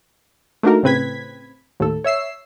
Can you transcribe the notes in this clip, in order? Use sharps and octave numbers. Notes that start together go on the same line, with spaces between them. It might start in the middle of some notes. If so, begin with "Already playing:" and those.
A3 A#3 D4 D#4 F#4 A#4
A2 C#3 C4 B4 G#6 B6
D#2 A2 A4
C#5 E5 E6 C7